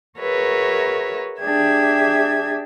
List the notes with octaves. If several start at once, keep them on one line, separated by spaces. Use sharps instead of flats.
F#4 G#4 A#4 B4 C#5 E5
D4 G4 G#4 E5 G#6